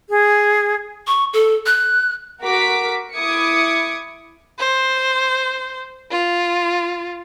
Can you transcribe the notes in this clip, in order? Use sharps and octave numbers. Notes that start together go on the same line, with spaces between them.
G#4
C#6
A4
F#6
F#4 A#4 D6 B6
E4 D6 D#6 G#6 C#7
C5
F4